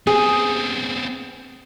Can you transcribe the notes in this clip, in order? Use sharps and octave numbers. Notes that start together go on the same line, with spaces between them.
B3 C4 G#4